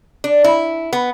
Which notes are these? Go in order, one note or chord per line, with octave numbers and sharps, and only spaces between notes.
D4
E4
B3